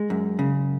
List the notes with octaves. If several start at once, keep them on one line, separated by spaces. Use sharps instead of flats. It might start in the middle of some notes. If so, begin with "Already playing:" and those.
Already playing: G#3
F#2
C#3